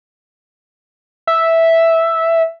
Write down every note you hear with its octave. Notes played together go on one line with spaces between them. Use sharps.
E5